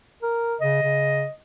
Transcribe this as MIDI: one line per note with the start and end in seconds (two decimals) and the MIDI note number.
0.23 0.56 70
0.61 0.82 49
0.61 1.34 75
0.83 1.24 49